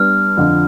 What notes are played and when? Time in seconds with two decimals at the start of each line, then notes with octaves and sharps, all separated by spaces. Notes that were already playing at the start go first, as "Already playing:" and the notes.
Already playing: G3 B3 D4 F6
0.37 F2 D3 F3